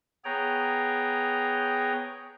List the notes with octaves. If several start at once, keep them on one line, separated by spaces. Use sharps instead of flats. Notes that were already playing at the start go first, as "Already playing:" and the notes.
B3 G#4 C#5 G5 A#5